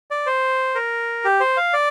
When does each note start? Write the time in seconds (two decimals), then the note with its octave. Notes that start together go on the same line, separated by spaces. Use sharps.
0.11 D5
0.26 C5
0.75 A#4
1.24 G4
1.40 C5
1.57 F5
1.73 D5